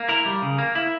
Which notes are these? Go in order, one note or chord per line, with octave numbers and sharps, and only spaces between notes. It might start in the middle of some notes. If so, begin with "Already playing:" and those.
Already playing: A#3
E4 A#4
G3
C#3
A#3
E4